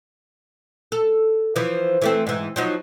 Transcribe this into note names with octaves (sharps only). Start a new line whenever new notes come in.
A4
E3 F3
E3 A3 C4
G#2 E3
F3 F#3 D#4